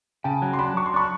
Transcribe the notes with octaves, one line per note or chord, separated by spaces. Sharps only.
C#3 G5 A5
F#3
C6
D4 A5 B5
F#3 C#6
C6
D4 B5 C#6